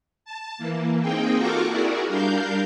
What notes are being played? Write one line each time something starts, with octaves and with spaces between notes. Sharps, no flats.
A5
E3 A#3
A#3 C4 D#4 G#4 G5
F4 F#4 A4 A#4 C#6 D6
E4 F#4 G#4 A#4 D5
G3 D4 A#4 F5 G6